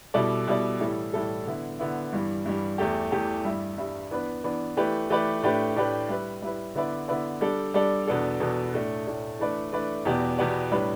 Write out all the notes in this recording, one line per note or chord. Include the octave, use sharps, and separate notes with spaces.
B2 G3 E4 A4 D5
B2 G3 E4 A4 D5
A2 E3 G3 E4 A4
A2 E3 G3 E4 A4
D3 B3 E4
D3 B3 E4
G2 E3 G3
G2 E3 G3
E2 E3 A3 G4
E2 E3 A3 G4
G2 G3 E4
G2 G3 E4
E3 B3 D4 B4
E3 B3 D4 B4
E3 A3 G4 B4 D5
E3 A3 G4 B4 D5
A2 A3 D4 G4 B4
A2 A3 D4 G4 B4
G3 E4 B4
G3 E4 B4
D3 B3 E4 B4 D5
D3 B3 E4 B4 D5
G3 D4 A4 D5
G3 D4 A4 D5
E2 B2 B3 D4 A4
E2 B2 B3 D4 A4
A2 A3 D4
A2 A3 D4
E3 A3 D4 B4 D5
E3 A3 D4 B4 D5
E2 B2 B3 G4 D5
E2 B2 B3 G4 D5
A2 G3 D4 B4